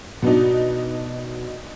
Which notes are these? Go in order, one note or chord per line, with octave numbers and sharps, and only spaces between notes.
B2 B3 D4 D#4